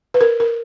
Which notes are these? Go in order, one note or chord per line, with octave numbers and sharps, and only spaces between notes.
B4
A#4
A#4